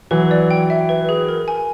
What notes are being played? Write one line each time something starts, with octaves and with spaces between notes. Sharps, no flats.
E3 F#3 B4
D5
G5
E5
B4
G#4
A#4
G#5